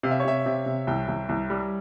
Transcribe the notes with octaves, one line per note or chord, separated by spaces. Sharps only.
C3 F5
E5
C#5
C3 E5
C3
C3
C2 G5
C2
C2
G3